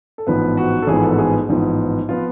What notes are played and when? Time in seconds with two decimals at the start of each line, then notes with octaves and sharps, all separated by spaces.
0.18 A4
0.27 A1 G#2 F3 B3 B4
0.57 F#4
0.82 A4
0.87 A1 G#2 F3 B3 G#4
1.03 A4
1.14 F#4
1.19 G#4
1.49 A1 G#2 F3 B3
2.09 F3 B3 F4